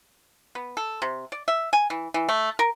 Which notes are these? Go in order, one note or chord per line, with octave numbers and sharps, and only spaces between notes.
B3
A4
C3
D5
E5
G#5
E3
E3
A3
A#4